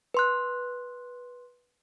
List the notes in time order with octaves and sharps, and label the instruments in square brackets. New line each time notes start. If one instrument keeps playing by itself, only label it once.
[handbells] B4 C6 F#6